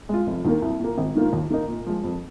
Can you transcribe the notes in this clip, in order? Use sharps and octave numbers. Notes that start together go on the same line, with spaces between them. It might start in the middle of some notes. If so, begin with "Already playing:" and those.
G#3 F4
F1
D#2 D#3 A#3
C2
A#2 A#3
G#1
G#2 D#3 A#3 F4
D#2
D#3 A#3 D#4
A#2
F3 G#3
F2